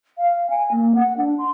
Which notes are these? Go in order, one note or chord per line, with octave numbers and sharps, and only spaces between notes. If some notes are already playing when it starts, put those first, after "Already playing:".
F5
G#5
A#3
F#5
D4
C6